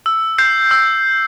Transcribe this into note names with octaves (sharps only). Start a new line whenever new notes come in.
E6
G6 C7
E6